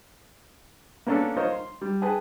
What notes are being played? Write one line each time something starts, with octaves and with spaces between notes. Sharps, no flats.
A#3 B3 C#4 D4 A4
F4 A#4 C5 C#5 D#5
C6
G3
G#4 B4 G5 A5